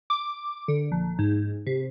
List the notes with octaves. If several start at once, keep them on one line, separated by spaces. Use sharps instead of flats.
D6
D3
A#1
G#2
C3